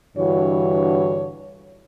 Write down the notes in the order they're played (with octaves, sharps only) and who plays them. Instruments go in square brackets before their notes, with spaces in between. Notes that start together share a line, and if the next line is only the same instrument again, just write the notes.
[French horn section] G2 D3 E3 F#4 C#5